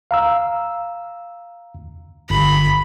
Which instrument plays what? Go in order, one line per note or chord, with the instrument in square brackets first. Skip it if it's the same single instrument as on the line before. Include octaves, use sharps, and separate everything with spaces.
[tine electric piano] F5 A#5 E6
[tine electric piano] G1 [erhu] B5